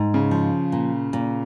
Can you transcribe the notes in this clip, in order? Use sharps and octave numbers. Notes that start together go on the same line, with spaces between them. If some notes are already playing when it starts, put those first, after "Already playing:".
Already playing: G#2
C#3
F3
A#2
A#2